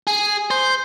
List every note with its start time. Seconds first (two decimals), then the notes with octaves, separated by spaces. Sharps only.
0.07 G#4
0.51 C5